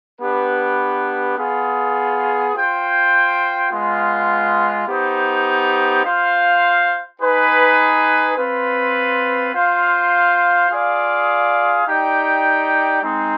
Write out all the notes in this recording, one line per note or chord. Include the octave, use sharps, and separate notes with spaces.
B3 D4 G4 B4
B3 F4 G#4
F4 C5 G5
G#3 B3 F4
B3 D#4 G4 C5
F4 C5 F5
D#4 G#4 B4
C4 F4 B4
F4 C5 F5
F4 G#4 D5 F5
D#4 G4 D5 G5
G#3 C4 D#4